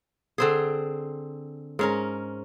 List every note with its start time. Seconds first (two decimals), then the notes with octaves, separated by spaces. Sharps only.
0.38 D3 C4 G#4
1.79 G#2 C#4 A#4